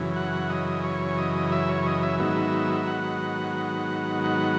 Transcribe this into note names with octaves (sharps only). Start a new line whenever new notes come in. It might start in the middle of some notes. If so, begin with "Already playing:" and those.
Already playing: F#2 C#3 E3
F#5
D#5
C#5
D#5
E5
C#5
D#5
E5
G#2 D#3 F#3 B3 E5
F#5
F#5